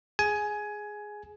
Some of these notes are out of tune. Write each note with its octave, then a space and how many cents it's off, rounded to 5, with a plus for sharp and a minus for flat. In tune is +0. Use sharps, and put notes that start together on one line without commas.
G#4 +0 G#5 +15